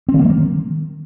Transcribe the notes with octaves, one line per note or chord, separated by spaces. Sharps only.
C4
D#3
A#3
F#3
D#3